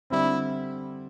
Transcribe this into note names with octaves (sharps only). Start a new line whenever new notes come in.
D3 G3 C4 E4